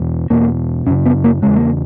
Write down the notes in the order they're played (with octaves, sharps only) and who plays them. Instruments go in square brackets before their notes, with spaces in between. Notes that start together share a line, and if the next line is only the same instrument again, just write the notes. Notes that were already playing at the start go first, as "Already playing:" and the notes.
Already playing: [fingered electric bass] E2 B2
E2 B2 A#3
F#2 C#3 C#4
B3
A#3
E2 C#3 G#3
A#3